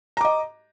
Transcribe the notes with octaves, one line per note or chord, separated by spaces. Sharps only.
D#5 A#5 D6